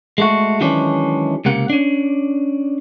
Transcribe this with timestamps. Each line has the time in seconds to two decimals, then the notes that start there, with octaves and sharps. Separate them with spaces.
0.18 G#3 A3 F#4
0.60 D#3 E3 F#3 G#3 C#4 D4
1.45 C#2 C3 A#3 F#5
1.70 C#4 D4